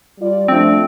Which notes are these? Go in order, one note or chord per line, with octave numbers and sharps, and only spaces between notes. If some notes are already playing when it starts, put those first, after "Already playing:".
G3 F4 D5
F3 A3 C4 D4